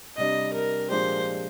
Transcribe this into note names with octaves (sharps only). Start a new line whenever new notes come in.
C3 G3 D4 D#5
A#4
A#2 F3 G#3 D4 G4 C5